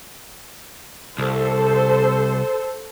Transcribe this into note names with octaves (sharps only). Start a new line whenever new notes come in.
C2 A4 C5